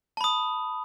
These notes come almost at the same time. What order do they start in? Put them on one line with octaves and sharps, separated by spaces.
A5 B5 D#6